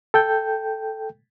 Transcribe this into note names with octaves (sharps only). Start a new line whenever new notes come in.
A4 G5 G6